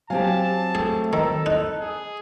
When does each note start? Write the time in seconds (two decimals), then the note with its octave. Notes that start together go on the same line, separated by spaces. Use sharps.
0.10 F#3 C4 G4 F5 G#5 A5
0.75 A3 G#4
1.13 D#3 A4 A#5 E6
1.46 D#4 F#6
1.81 G#4